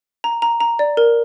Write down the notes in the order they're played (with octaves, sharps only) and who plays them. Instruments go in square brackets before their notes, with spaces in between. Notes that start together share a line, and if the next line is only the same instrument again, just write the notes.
[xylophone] A#5
A#5
A#5
D5
A#4